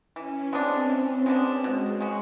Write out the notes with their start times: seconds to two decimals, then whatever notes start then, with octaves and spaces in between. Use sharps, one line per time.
0.15 E3 C#4
0.52 G#3 B3 C4 D4
0.90 E3 C#4
1.26 G#3 B3 D4
1.63 B2 G#3
2.01 G#3 C#4 F#4